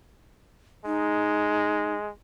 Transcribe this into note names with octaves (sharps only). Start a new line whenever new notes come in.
G#3 D#4